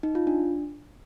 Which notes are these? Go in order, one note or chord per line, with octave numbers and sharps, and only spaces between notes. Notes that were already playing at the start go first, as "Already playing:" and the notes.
D#4
F4
D4